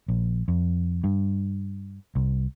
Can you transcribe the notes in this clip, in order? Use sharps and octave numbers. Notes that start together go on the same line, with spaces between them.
A#1
F2
G2
C2